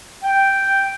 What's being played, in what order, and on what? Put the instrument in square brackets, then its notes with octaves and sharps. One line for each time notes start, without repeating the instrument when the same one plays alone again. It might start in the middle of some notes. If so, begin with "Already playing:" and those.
[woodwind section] G5